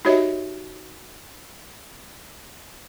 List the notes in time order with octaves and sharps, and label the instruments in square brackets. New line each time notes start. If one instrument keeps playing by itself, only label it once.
[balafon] D#4 F#4 G4 C#5 D#5 E5